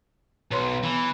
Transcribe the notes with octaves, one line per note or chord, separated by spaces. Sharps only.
B1 B4 C#5 C6
E3 B3